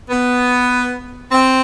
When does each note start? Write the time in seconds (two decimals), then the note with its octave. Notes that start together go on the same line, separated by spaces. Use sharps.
0.10 B3
1.32 C4